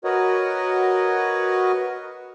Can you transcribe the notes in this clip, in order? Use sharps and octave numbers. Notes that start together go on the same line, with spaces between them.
F#4 A#4 B4 C#5 D#5 F#5